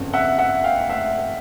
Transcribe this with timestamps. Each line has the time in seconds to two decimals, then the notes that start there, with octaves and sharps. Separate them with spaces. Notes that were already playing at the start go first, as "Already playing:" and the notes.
Already playing: G1 F2 C#3
0.13 E5 F#5
0.38 E5 F#5
0.64 F5 G5
0.89 E5 F#5